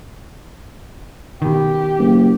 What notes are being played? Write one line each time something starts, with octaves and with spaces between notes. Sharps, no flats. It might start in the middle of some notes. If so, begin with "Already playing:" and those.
B2 D#3 G4
F#1